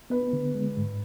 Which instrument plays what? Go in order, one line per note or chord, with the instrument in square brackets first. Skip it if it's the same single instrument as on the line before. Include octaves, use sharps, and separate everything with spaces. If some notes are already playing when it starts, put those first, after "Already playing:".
[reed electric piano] B3 [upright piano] B4
[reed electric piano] D3
G#3
G#2